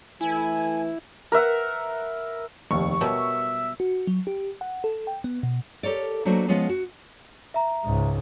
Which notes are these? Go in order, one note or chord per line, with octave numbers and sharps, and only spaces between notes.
E3 A3 E4 G#5
A#4 B4 E5 F#5
F1 D#2 C#6
B2 F#3 G3 A#4 E5
F#4
F#3
G4
F#5
A4
G5
B3
B2
G4 A4 A#4 C#5 D5
F#3 A3 A#3 D4 F#4 C5
F3 G#3 B3 C#4 F4 G#4
F#4
E5 A#5
C#2 G#2